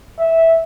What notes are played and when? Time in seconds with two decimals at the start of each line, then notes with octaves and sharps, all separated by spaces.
0.19 E5